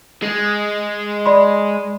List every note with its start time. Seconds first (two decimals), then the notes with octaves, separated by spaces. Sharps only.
0.23 G#3
1.26 D5 B5 C6